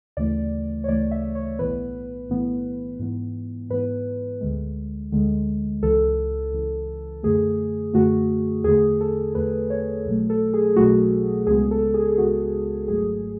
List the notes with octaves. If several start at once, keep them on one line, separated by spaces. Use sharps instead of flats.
D2 C#3 E3 A3 D5
C#5
D2 C#3 E3 A3 D5
E5
C#5
B1 A2 E3 B3 B4
B1 A2 E3 B3
G#2 E3 B3
G#2 E3 B3 B4
D2 D3 G#3
D2 D3 G#3
C#2 C#3 E3 A4
C#2 C#3 E3
F#2 D3 A3 G#4
F#2 D3 A3 F#4
E2 D3 A3 G#4
A4
E2 D3 A3 B4
C#5
B1 B2 F#3 A3
A4
G#4
B1 B2 F#3 A3 F#4
C#2 C#3 G#3 B3 G#4
A4
G#4
C#2 C#3 G#3 B3 F#4
G#1 G#2 F#3 A3 G#4